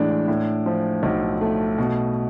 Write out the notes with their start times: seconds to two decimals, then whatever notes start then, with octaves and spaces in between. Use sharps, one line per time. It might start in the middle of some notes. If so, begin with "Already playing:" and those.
Already playing: A2 E3 G#3 D4
0.28 A2
0.66 F3
1.03 B1
1.41 A3
1.78 B2